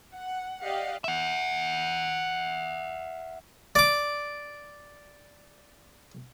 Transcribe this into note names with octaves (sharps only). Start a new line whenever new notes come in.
F#5
G4 D5 D#5 F5 F#5
E5 F#5
D5 D6